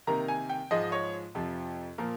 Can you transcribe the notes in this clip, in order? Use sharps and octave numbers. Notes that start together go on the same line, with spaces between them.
C3 D#3 A#3 A#5
G#5
G5
G#2 F3 G#3 D#5
C#5
F2 C3 F3
A#2 F3 A#3 A#4